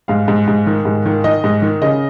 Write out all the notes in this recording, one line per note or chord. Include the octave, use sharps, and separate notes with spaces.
G#2 F5
G#2
G#2
D#3
G#2
D#3
D#3 D#5
G#2
D#3
C#3 D#5